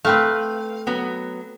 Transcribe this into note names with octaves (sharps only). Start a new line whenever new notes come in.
A3 C4 B4 F5
F#3 B3